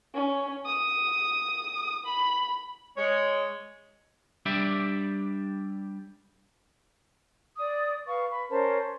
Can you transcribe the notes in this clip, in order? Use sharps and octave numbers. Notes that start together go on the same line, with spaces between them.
C#4
D#6
B5
G#3 C#5
G3 D4 G4 D5 E5
D5 D#6
B4 F5 C#6
B5
C#4 A#4 C5 A5